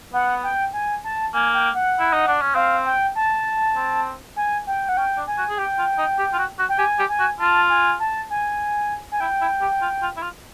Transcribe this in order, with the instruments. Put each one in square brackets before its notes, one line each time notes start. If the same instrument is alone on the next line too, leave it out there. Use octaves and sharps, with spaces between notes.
[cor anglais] B3 [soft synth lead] F#5
[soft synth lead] G5
G#5
A5
[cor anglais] A#3 [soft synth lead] G#5
[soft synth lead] G5
F#5
[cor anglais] E4
D#4
D4
C#4
[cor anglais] C4 [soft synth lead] F5
[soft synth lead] G5
A5
[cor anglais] C4
[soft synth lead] G#5
G5
F#5
[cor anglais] C#4 [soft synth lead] G5
[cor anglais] D4
[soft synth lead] G#5
[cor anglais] F#4
G#4
[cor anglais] G4 [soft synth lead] G5
[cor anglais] F4
D#4
G4
F4
F#4
F#4
[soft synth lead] G5
[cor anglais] G4 [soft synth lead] G#5
[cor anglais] G4
[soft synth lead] G#5
[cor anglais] F#4
[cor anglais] F4 [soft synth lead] A5
[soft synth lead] G#5
A5
G#5
G#5
[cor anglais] E4 [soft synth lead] G5
[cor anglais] E4
G4
F4
F4
E4
F4